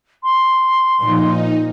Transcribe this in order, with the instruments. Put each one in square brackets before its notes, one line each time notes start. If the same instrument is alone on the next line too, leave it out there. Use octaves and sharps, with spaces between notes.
[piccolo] C6
[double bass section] A#2 F3 [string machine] D#4